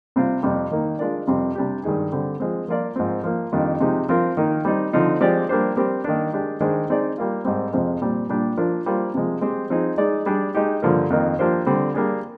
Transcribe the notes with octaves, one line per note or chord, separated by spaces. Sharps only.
C3 G3 C4 F4
F2 C3 G3
D#3 A#3 D#4
G#3 D4 F4 A#4 D5
F2 C3 G3 C4
C3 G3 D4 G4
G2 D#3 G#3 D#4 G#4
D3 G3 C4
F3 G#3 C4
F3 A#3 F4 A#4 D5
G#2 F3 C4
F3 A#3 F4
F2 D#3 G3 D4 F4
C3 F3 G#3 D#4 G4
F3 C4 F4 A#4
D#3 A#3 D#4
G3 C4 D#4
D3 F3 C4 D#4
F3 G#3 C4 G4 D5
G3 A#3 D4 G4 C5
G3 C4 G4 A#4
D#3 A#3 D4
G#3 D4 G4
D#3 G#3 D4 G#4 C5
G#3 C4 D#4 G#4 D5
G3 A#3 F4
G#2 G3 C4
F2 C3 F3 G#3 C4
A#2 G3 C4
A#2 G3 D4 G4
F3 A#3 D4 F4 A#4
G3 A#3 F4 C5
C3 F3 G#3
G#3 C4 G4 C5
F3 C4 D#4 G#4
G#3 D#4 G#4 D5
G3 D4 G#4
G#3 D#4 G4
G2 D3 F3 A#3
F2 D#3 A#3
F3 A#3 D4 G4 C5
D3 G3 C4
G3 A#3 D4 G#4